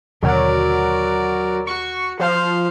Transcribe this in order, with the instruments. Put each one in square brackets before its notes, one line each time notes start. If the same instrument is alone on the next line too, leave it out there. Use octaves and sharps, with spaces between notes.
[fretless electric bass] D#2 B2 D3 [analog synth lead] F#3 [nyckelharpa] A#4 D5
[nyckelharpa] F#4 [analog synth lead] C#6
[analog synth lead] F3 [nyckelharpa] C5 F5